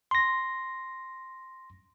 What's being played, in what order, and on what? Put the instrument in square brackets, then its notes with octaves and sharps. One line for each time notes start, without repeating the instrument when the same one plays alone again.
[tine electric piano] C6 A#6